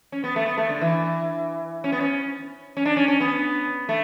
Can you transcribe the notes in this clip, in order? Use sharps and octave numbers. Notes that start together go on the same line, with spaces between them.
C#4
B3
A3
B3
A3
D3
E3
C#4
B3
C#4
C#4
D4
C#4
C#4
B3
A3